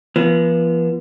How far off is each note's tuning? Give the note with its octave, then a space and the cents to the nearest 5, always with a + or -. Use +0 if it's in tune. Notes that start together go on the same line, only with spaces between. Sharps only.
F3 -40 B3 -30